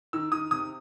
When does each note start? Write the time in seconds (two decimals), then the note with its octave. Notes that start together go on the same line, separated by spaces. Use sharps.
0.13 D#3 E6
0.32 D#3 D#6
0.51 C3 D#6